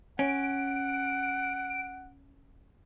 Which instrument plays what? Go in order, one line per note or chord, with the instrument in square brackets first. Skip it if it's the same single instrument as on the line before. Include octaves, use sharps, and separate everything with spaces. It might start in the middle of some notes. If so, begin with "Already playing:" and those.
[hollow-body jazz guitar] C#4 [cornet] F#5 [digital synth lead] D7